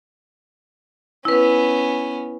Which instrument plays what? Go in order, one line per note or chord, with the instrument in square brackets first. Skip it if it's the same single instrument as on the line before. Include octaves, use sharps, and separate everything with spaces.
[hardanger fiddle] B3 C#4 [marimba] E4 B4